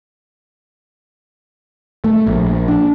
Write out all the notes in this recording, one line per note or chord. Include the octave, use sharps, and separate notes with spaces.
A3
A#1
D4